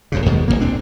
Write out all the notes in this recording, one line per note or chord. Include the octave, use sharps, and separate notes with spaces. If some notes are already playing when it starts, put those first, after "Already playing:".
F1 F#2 C#3
D#2 B2 D#3 G#3
D1 A1 B2 A#3
D#1 C4 D4